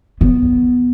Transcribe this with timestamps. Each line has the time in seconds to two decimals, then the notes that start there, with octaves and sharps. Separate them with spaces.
0.21 B3